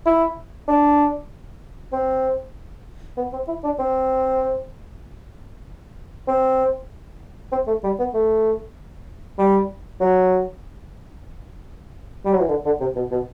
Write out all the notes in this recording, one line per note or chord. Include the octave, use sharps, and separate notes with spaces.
E4
D4
C4
B3
C4
E4
D4
C4
C4
C4
A3
G3
B3
A3
G3
F#3
G3
F#3
E3
D3
D3
C3
B2
B2